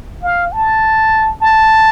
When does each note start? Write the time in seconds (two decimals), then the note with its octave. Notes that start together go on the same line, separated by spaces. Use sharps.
0.23 F5
0.52 A5
1.42 A5